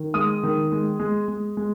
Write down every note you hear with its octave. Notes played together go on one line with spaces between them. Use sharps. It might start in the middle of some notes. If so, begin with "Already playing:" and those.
Already playing: D#3
G#3 D#6
D#3
G#3
G#3
G#3
G#3